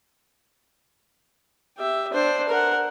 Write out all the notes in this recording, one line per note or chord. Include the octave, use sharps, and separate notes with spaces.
G4 E5
D4 C5
A#4 F#5